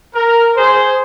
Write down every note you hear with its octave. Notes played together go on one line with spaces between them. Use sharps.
A#4
G#4 C5